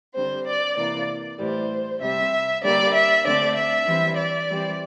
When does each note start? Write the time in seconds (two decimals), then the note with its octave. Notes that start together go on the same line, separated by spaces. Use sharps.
0.14 D3 G3 C4 C5
0.45 D5
0.77 C3 E3 A#3 D5
1.38 A2 E3 G3 C5
2.00 C3 G3 C4 E5
2.62 D3 G3 A#3 D5
2.93 E5
3.24 D3 A3 C4 D5
3.55 E5
3.86 E3 G3 C4
4.17 D5
4.49 E3 G3 C4